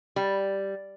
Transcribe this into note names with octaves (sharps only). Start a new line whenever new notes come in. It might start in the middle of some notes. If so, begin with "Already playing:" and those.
G3